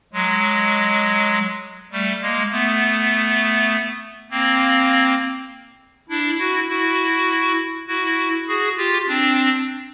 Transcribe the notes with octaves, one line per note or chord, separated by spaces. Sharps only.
F#3 G#3
G3 A3
G#3 A#3
A3 B3
A#3 C4
D4 E4
E4 F#4
E4 F#4
E4 F#4
F#4 G#4
F4 G4
C4 D4